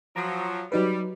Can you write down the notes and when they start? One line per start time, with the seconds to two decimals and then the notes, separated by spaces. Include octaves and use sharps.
0.16 F3 F#3 A#5 D#6
0.72 F#3 G3 D#4 B4